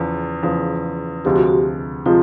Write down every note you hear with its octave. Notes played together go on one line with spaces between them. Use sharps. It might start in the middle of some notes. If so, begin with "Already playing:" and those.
Already playing: E2 C#3 F3
E2 C#3 F3
D2 C3 F3 G#3 G4
F#4
G4
C3 F3 G#3 F4